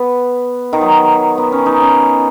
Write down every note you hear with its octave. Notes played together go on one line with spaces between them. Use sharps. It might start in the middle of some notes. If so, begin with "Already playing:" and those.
Already playing: B3
D#3
F#3
B3
C#4
D#4
C#4